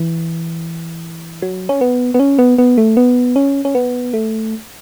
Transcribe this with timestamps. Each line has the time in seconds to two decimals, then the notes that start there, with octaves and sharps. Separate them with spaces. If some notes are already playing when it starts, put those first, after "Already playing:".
Already playing: E3
1.42 F#3
1.69 C#4
1.81 B3
2.14 B3
2.20 C#4
2.38 B3
2.58 B3
2.78 A3
2.97 B3
3.36 C#4
3.65 C#4
3.75 B3
4.14 A3